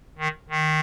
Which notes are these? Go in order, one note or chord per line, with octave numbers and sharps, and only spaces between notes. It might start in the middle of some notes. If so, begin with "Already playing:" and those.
D#3
D#3